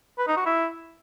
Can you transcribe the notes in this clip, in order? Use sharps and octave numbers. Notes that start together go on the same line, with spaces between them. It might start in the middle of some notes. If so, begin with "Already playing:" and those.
B4
D#4
F#4
E4